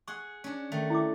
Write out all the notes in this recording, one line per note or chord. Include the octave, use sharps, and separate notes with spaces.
G#4 F#5 C#6
C#4 D4
D#3 A3
E4 E5 D6